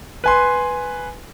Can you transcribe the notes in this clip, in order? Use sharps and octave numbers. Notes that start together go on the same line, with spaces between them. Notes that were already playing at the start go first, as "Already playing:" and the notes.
B4 G#5 C6